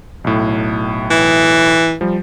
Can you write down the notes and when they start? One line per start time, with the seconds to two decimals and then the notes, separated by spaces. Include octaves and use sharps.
0.24 B1 A2
1.10 E3
2.01 F3 G3